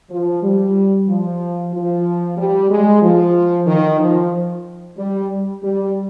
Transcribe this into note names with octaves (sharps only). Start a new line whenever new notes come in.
F3
G3
F3
F3
G3
G#3
F3
D#3
F3
G3
G3